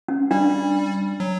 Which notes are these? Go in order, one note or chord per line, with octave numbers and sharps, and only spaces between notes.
C#4
G3 D4
F#3